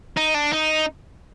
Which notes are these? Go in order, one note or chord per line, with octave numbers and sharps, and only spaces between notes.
D#4
D4
D#4